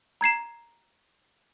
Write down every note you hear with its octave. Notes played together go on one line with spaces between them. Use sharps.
A#5 G#6 C7 E7